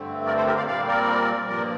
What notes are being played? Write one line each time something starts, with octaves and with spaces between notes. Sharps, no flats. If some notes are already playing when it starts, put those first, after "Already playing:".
Already playing: G2 D3 A3 C4
A#4 D5
A4 C5
G4 A#4
D5 F5
A#2 G3 C4 D5 F5
A#4 D5
G2 F3 A#3 A#4 D5